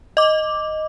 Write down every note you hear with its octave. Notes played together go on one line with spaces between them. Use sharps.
D#5 D6